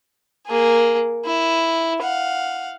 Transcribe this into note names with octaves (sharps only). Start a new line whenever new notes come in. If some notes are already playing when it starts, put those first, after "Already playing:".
A#3 G#4
E4
F5 F#5